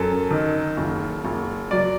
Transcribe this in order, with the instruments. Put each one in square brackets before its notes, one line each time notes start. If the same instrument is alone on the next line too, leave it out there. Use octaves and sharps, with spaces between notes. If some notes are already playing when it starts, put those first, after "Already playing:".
Already playing: [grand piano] F#2 A4
D#3
F#1
F#1
F#3 D5